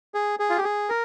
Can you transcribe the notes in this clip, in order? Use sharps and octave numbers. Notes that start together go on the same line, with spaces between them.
G#4
G#4
F4
G4
G#4
A#4